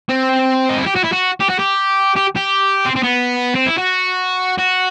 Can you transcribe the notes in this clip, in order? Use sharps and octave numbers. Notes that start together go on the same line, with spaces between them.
C4
D#4
E4
G4
F#4
E4
F#4
G4
F#4
G4
G4
G4
C4
C4
B3
C4
E4
F#4
F#4